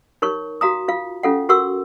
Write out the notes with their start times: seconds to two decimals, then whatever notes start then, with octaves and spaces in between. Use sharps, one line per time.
0.22 D#4 A#4 C#5 C#6
0.61 F#4 F5 A#5 D#6
0.88 F4 F5
1.23 C#4 F4 A4 F5 F#5
1.49 F#4 A#4 F#5 C#6 E6